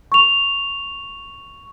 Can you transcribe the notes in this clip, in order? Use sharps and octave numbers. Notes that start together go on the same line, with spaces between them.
C#6 F7